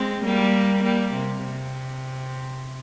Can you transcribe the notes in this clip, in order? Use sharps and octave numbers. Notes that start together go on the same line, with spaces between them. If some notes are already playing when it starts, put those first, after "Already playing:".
Already playing: G#3 C4
G3 A#3
G3 A#3
C3
C3